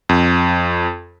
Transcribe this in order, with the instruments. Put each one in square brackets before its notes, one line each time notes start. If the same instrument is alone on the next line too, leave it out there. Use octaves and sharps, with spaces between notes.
[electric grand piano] F2